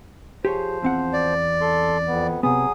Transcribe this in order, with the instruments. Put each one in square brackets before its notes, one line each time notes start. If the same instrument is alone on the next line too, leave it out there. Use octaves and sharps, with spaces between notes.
[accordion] F3 C5 [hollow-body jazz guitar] G4 G#4 C#5
[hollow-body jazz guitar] E2 C4 F#5
[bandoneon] D5
[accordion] A4 C6
F2 B3
[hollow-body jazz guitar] C3 B3 [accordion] F#3 G#4 D#6